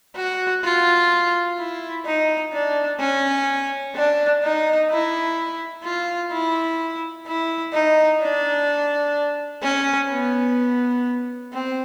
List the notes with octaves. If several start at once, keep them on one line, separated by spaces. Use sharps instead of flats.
F#4
F4
E4
D#4
D4
C#4
D4
D#4
E4
F4
E4
E4
D#4
D4
C#4
B3
C4